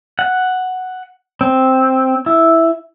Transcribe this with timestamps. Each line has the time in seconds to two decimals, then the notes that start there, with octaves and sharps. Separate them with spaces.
0.19 F#5
1.41 C4
2.26 E4